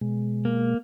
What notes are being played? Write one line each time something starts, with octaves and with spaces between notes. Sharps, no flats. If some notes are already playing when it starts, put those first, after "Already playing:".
B2 G#3
A#3